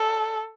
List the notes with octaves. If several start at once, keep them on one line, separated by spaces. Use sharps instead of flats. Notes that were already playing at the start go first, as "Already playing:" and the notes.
Already playing: A4